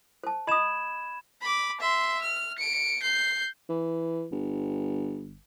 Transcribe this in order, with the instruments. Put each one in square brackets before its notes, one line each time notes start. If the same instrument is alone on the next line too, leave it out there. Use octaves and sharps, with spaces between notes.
[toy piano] C5 A5
[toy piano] D#5 D#6 [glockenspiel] B5 G#6 E7
[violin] B5 D6
E5 C6
F6
C#7 D7
G6 C7
[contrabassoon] E3
G1